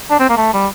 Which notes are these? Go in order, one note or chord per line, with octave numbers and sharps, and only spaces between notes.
D4
C4
A#3
A3
G3